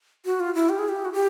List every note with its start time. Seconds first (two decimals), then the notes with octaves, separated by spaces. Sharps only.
0.25 F#4
0.40 F4
0.55 E4
0.69 G4
0.79 G#4
0.89 G4
1.05 F#4
1.13 G4